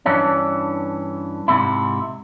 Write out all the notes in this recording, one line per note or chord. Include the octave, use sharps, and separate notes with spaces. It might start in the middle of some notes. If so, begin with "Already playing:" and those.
G2 E3 C#4 D4
G#2 C3 E4